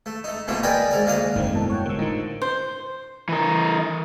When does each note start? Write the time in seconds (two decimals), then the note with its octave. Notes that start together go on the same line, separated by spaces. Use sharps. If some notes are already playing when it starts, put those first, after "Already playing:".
0.06 A3
0.24 A3 D#4
0.48 B2 E3 F3 A3 A#3
0.63 G#4 A#4 B4 D5 D#5 G5
0.91 G#2 A#4 D5
1.06 D2 A#3 D#5 F5 D#6
1.36 G1 F2 G#2 D#3 A#3 C4
1.52 B2 G#3 A#3 E4 A4
1.70 C#5 F#5 G5
1.85 C3 D#3 G#3 A#4 C5 E6
1.98 A2 D3 D#4 F4
2.42 C5
3.29 E3 A#4